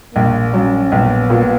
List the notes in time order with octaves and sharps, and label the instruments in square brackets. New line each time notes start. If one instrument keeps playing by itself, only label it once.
[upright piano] A#1 [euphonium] A#3
[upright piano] F#3 [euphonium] C#4
[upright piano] A#1 [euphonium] B3
[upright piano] A#2